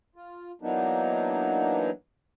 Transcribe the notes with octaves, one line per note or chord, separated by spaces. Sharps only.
F4
E3 F#3 A#3 B3 D4 D#4